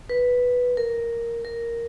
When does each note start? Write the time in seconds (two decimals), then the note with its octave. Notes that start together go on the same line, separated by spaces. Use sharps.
0.10 B4
0.77 A#4
1.45 A#4